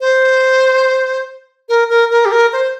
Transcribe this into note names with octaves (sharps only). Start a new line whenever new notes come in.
C5
A#4
A#4
A#4
G4
A#4
C5